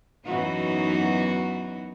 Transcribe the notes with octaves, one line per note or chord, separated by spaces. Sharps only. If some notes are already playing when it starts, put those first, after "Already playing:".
F#2 E3 B3 D#4 F#4